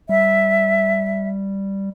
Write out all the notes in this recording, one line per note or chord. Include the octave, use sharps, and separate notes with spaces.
G3 E5